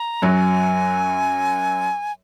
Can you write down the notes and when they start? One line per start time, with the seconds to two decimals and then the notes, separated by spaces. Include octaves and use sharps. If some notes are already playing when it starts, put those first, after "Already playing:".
Already playing: A#5
0.22 F#2 F#3 G#5